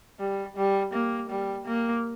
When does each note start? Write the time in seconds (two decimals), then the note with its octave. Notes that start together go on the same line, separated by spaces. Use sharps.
0.20 G3
0.57 G3
0.94 A#3
1.30 G3
1.67 A#3